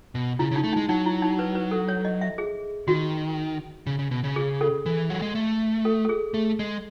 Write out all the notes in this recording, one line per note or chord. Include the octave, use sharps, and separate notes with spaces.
B2
C#3 E4
C#3
D#4
A3
G#3 D#4
F#3 D#4
E4
D#4
B4
B4
A4
C#5
D#5
E5
G#4
D#3 F#4
C#3
C#3
B2
C#3
G#4
A4
E3
F#3
G#3
A3
A4
A4
G#4
A3
G#3